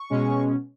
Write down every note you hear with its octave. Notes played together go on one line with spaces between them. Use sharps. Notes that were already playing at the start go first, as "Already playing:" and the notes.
Already playing: C#6
B2 G#3 C#4